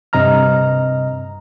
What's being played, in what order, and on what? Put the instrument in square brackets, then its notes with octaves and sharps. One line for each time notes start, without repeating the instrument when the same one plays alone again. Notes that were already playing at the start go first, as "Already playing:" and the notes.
[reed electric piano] G2 C3 D#5 A#5 F6